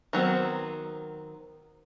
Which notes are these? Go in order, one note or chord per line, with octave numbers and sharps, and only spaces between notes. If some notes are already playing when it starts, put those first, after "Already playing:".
D#3 F#3 B3 C4